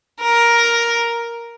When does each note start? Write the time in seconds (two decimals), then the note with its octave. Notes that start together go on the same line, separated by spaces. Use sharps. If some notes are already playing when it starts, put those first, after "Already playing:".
0.21 A#4